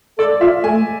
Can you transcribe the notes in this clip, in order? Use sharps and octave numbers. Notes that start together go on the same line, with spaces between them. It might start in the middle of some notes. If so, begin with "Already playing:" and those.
A4 D5
F4 E5
A3 G#5